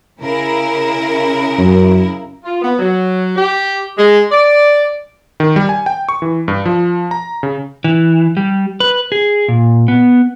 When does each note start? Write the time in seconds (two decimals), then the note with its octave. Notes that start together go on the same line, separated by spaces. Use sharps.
0.20 C#3 E4 A#4
1.58 F#2
2.44 F4
2.62 B3
2.79 F#3
3.36 G4
3.97 G#3
4.31 D5
5.40 D#3
5.56 G3
5.69 G#5
5.86 G5
6.09 C#6
6.22 E3
6.48 G2
6.66 F3
7.11 A#5
7.43 C#3
7.84 E3
8.37 G3
8.80 B4
9.12 G#4
9.48 A#2
9.88 B3